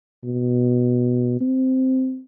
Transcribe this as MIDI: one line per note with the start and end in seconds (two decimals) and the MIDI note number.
0.24 1.36 47
1.41 2.20 60